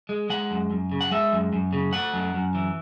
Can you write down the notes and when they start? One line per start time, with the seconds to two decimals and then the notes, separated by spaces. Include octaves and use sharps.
0.09 G#3
0.30 G#3 F#5
0.51 F#2
0.71 F#2
0.92 C#3
1.01 F#5
1.11 G#3 E5
1.32 F#2
1.53 F#2
1.73 C#3
1.93 A3 F#5
2.13 F#2
2.34 F#2
2.55 E3